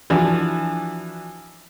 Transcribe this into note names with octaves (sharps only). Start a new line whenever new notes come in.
E3 F3 D4 F#4